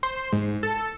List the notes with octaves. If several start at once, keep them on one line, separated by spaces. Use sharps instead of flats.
C5
G#2
A4